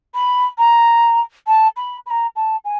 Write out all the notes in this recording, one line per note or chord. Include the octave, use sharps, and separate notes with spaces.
B5
A#5
A5
B5
B5
A#5
A5
G#5